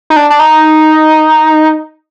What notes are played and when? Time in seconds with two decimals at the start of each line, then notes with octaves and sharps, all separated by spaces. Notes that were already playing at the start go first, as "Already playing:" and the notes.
0.10 D#4
0.16 D4
0.30 D4
0.40 D#4